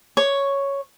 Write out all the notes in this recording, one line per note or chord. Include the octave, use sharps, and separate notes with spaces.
C#5